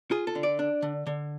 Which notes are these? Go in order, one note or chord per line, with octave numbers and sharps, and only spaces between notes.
F4 G#4
A4
D3
D5
D4
D3
D3